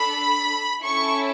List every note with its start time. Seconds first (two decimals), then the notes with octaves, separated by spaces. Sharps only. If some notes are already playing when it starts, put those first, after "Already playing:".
Already playing: D4 A4 B5
0.81 C#4 E4 A4 C#6